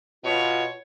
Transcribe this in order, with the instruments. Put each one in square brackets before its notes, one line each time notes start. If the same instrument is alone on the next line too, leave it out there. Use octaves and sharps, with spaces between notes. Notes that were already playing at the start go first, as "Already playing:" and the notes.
[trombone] B2 [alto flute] F4 [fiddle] C#5